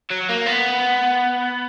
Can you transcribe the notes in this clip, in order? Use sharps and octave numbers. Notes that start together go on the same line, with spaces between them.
F#3
A#3
B3